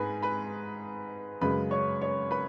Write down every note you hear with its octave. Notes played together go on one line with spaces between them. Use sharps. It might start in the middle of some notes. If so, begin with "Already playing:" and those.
Already playing: G#2 G#3 G#4 B4 G#5 B5
B4 B5
F#2 C#3 G#3 B4 B5
C#5 C#6
C#5 C#6
B4 B5